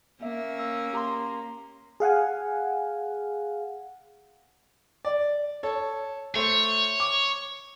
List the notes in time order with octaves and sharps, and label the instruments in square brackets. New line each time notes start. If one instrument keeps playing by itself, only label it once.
[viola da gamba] A#3 C#4 [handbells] E5
[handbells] E6
G4 A#5 C6
[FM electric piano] G#4 F5 F#5 G#5
[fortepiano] D5
A4 C#5
[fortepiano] A3 C5 [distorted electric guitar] C#5
[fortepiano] D6